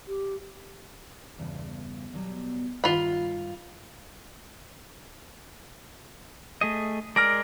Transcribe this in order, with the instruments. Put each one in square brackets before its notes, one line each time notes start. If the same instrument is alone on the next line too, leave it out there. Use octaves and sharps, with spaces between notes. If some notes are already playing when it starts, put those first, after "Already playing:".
[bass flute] G4
[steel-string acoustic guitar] E2 G2 C#3
B2 F#3 G3
[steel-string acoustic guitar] G2 D#3 A#5 [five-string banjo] F4 B5
[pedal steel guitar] A3 G#4 D#5
[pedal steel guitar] G#3 A#4 D5 [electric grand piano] F6 A#6 D7